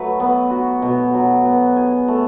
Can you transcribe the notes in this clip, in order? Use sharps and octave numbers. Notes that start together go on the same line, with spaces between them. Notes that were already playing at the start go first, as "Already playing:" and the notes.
Already playing: F#3 A3 B4
B3
F#4
B2
F#3
B3
G#4
A3